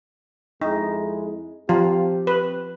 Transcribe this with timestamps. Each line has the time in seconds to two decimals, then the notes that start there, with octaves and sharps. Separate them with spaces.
0.61 F2 G#3 D#4 E4
1.69 F3 C4 F4 G4
2.27 B4